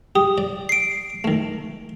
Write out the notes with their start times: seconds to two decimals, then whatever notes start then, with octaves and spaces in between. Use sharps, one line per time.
0.15 G4 D#6
0.38 D5
0.69 C7 D7
1.24 D#3 A3